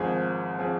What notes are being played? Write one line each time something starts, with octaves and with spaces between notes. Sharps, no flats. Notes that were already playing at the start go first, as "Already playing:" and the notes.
Already playing: G#1 G#2 F3 C4 G#4
F3 C4 G#4